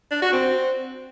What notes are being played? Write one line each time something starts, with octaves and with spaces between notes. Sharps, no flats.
D4
F#4
C4